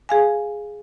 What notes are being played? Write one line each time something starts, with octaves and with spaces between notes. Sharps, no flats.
G#4 F5 G#5